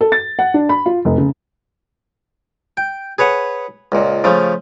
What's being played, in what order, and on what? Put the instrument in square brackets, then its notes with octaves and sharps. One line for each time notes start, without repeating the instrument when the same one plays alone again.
[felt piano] A4
A6
F#5
D4
B5
F4
F1
C#3
[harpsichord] G5
G#4 B4 C#5 F#5
C#2 A#2
C#3 F3 A3